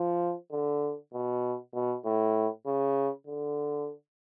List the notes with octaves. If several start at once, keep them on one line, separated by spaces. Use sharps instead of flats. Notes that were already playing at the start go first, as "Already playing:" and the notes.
Already playing: F3
D3
B2
B2
A2
C#3
D3